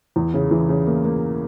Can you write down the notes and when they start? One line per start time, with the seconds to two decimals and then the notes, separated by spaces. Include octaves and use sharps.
0.16 E2
0.34 C#3
0.51 E3
0.69 C#3
0.87 A#3
1.05 A#3